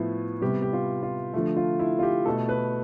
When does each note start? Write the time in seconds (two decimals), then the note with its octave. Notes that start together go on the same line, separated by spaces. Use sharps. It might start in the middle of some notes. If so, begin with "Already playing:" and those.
Already playing: A2 F3 B3 E4
0.41 C3 G3 B3 G4
0.62 G4
0.73 F4
1.03 F4
1.34 D3 F3 A3
1.56 F4
1.79 E4
1.99 F4
2.03 G4
2.25 B2 A3 A4
2.49 B4